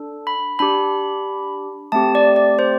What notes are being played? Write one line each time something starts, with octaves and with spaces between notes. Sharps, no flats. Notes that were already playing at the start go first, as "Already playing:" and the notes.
Already playing: D4 A4
B5
D4 G4 B5
A3 C4 G4 A5
D5
D5
C5